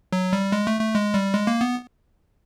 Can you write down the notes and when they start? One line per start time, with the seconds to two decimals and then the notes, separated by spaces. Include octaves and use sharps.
0.13 F#3
0.33 G3
0.52 G#3
0.67 A3
0.80 A3
0.94 G#3
1.14 G3
1.34 G#3
1.47 A#3
1.61 B3